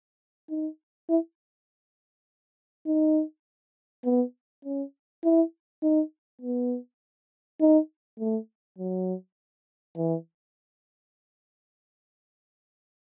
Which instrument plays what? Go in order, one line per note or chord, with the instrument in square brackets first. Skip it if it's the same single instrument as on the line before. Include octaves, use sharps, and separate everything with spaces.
[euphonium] D#4
E4
D#4
B3
C#4
E4
D#4
B3
D#4
A3
F#3
E3